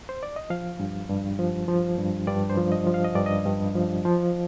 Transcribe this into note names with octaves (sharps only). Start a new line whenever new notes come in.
C5
D5
D#5
F3 F5
G2
G2
F3
F3
G2
G2 D5
C5
F3
D#5
F3
F5
D#5
G2 D5
D#5
G2
F3
F3